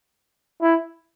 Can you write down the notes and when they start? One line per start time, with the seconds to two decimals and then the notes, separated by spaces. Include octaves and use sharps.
0.61 E4